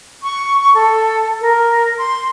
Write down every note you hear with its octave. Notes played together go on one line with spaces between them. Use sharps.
C#6
C#6
A4
A#4
C6